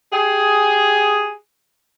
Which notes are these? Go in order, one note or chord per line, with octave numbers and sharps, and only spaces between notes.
G4 G#4